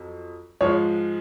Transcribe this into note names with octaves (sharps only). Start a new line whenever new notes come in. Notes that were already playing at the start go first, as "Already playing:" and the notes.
Already playing: F2 F#3
G#2 F3 G#3 C#5